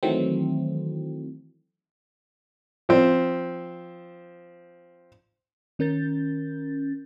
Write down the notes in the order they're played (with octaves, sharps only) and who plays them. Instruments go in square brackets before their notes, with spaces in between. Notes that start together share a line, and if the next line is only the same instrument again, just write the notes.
[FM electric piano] D#3 E3 F#3 A3 C4
[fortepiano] F3 C4
[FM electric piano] D#3 C#4 A#4 G6 A6